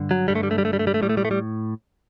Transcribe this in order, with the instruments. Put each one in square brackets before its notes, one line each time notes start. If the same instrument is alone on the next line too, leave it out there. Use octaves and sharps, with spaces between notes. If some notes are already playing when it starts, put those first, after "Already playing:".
Already playing: [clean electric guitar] G2 D3
F#3
G2 D3 G3
A3
G3
A3
G3
A3
G3
A3
G3
A3
A2 G3
A3
G3
A3
G3